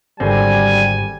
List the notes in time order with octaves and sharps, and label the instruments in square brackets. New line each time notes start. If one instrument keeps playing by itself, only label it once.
[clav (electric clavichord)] G#1 D3 C4 [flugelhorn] G3 [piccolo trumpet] G#5